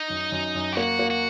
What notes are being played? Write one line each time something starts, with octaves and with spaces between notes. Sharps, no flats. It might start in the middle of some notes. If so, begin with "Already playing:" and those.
Already playing: D#4
F#2
F#2
F#2
G4
A#3 F#4
A#3
F#4